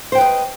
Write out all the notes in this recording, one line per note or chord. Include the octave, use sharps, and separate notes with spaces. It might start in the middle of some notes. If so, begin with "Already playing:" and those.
B4 C5 D#5 G5